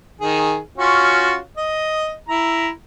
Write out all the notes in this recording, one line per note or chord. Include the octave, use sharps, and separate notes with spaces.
D#3 G#4
C#4 F4 F#4
D#5
E4 A#5